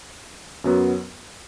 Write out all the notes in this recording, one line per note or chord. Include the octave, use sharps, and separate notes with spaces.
F#2 F#3 B3